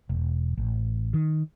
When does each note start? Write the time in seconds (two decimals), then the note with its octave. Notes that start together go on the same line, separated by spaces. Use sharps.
0.09 E1
0.57 A1
1.14 D#3